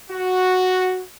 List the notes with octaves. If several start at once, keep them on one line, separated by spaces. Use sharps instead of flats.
F#4